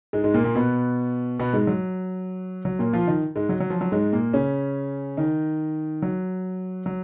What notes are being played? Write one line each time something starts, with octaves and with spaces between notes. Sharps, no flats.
G#2 G#3
G#2 G#3
A#2 A#3
A#2 A#3
B2 B3
B2 B3
G#2 G#3
F#3
F#3
A#2 A#3
F3 F4
D#3 D#4
G#2 G#3
F#3
F#3
F3
F#3
G#2 G#3
A#2 A#3
C#3 C#4
D#3 D#4
F#3
F#3